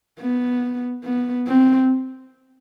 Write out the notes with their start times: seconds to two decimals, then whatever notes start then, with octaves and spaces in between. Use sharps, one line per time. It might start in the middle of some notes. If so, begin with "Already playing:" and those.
0.20 B3
1.04 B3
1.47 C4